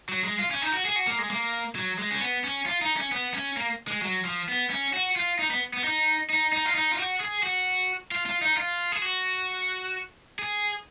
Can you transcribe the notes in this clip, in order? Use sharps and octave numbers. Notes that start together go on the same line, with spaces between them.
F#3
G#3
F4
C#4
D#4
F#4
G#4
F#4
A#3
G#3
A#3
F#3
G#3
C#4
B3
C#4
F4
D#4
C#4
B3
C#4
A#3
G#3
F#3
F3
B3
C#4
F#4
F4
D#4
B3
B3
D#4
D#4
D#4
F4
D#4
F4
F#4
G#4
F#4
F4
F4
D#4
F4
G#4
F#4
G#4